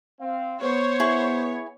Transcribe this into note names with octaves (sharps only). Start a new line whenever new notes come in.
C4 F5
B3 C5 C#5
E4 G#4 C#6